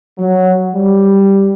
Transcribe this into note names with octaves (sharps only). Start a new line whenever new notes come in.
F#3
G3